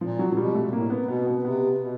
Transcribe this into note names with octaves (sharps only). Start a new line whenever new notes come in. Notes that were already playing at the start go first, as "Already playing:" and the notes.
A#2 F3
F#3
F#3
B2 G3
A3
A2 A#3
B3
B2 B3
B3
C3 B3
B2